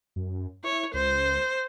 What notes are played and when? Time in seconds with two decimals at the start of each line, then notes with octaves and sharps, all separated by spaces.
0.16 F#2
0.64 E4 C#5
0.94 C#2 C5